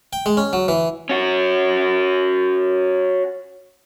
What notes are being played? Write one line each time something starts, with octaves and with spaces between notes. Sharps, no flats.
G5
G#3
C#4
F#3
E3
C#4 F#4